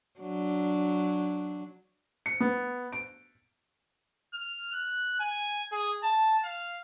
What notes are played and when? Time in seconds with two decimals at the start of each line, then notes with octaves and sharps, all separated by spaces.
0.20 F#3 D4
2.26 C#7
2.40 B3
2.92 D7
4.33 F6
4.73 F#6
5.19 G#5
5.72 G#4
6.03 A5
6.44 F5